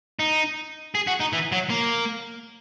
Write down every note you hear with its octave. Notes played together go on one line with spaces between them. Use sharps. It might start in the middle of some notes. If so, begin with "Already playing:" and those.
D#4
G#4
F#4
D#4
E3
F#3
A#3